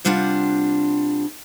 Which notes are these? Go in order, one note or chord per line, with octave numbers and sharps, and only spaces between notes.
C3 G3 D4 F4 F#5